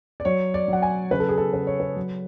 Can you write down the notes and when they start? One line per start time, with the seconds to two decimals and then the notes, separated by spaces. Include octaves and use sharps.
0.20 D5
0.25 F#3 C#5
0.54 D5
0.68 F#3 F#5
0.82 G#5
1.11 C#3 B4
1.20 A4
1.29 G#4
1.38 A4
1.53 C#3 B4
1.67 C#5
1.80 B4
1.96 F#3